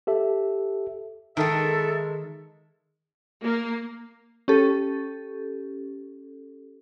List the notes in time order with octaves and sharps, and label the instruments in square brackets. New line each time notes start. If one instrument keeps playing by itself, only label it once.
[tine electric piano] G4 A4 E5
[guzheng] D#3 [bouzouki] G#3 A#4 [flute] A4 [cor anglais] E5
[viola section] A#3
[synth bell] C#4 G4 A4